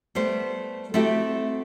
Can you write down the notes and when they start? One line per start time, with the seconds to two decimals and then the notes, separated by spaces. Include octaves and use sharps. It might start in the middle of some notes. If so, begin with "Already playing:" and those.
0.15 G3 A3 B3 C5
0.94 A3 C4 E4 F#4 G4 A4